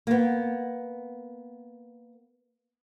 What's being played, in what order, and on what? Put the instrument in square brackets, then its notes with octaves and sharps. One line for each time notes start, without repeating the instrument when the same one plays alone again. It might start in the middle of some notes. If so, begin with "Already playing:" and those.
[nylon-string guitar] A#3 B3